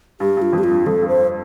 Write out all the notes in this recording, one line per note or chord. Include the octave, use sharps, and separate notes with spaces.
G2 G4
G2
F4
F2
G4
F4
G2
F2 A4
G2
C5